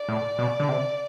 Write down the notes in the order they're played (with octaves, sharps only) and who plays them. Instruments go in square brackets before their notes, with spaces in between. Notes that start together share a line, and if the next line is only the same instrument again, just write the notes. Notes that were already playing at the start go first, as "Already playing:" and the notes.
Already playing: [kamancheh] D5
[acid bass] A2
B2
D3
C3